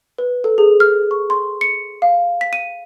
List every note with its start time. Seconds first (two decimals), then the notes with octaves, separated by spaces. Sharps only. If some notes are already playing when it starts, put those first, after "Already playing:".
0.18 B4
0.44 A4
0.58 G#4
0.80 F6
1.11 C#6
1.30 C6
1.61 C#7
2.02 F5
2.41 B6
2.53 D#7